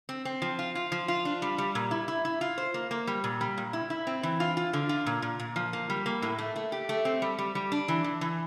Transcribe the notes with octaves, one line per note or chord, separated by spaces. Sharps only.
C4
C4
F3
F4
F4
F3
F4
D4
G3
G3
A#2
E4
E4
E4
F4
C5
A#3
A#3
G3
A#2
G3
A#2
E4
E4
C4
E3
F4
F4
D3
F4
A#2
A#2
A#2
F3
A#3
G3
A#3
A2
A3
A3
G4
A3
C4
G3
G3
G3
D4
E3
E3
E3